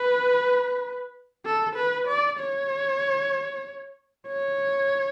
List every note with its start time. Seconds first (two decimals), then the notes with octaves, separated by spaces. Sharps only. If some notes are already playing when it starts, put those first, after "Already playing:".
Already playing: B4
1.45 A4
1.76 B4
2.08 D5
2.39 C#5
4.27 C#5